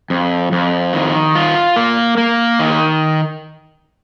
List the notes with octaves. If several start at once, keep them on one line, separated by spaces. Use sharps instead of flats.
F2
F2
D#3
F4
A#3
A#3
D#3